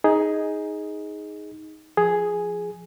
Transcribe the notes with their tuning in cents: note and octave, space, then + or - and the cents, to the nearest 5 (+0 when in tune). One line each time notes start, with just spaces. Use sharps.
D#4 +10 G#4 +0
F3 +0 G#4 +5